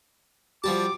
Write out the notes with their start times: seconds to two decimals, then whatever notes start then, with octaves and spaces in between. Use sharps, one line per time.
0.64 F3 G3 F#4 G4 A5 D6